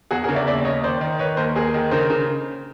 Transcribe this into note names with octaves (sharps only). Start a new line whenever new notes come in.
E2 F#4 G#4
G#4 A#4
C#3
D5 E5
D#2 D5 E5
D#2 C#5 D#5
D#3 C5 D5
D#3
D#3 B4 C#5
B4
D#2 A#4 C5
D#2 G#4 A#4
D#3
C#3 A#4 C5
C#3